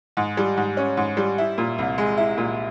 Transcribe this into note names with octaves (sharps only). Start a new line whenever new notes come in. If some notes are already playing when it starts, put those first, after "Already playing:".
G#2
G3
G#2
C#4
G#2
G3
E4
A#2
C2
G#3
E4
A#2